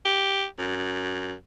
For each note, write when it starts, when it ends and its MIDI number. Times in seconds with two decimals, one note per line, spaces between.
0.05 0.45 67
0.59 1.34 42